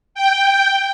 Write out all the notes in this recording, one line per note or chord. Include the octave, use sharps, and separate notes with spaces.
G5